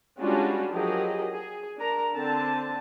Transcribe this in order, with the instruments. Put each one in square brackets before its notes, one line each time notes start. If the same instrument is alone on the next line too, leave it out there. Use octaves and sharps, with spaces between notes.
[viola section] G3 G#3 C#4 D4 F4 F#4
F3 F#3 G4 G#4 A#4 D#5
G#4
D4 A#4 A#5
D3 C4 A5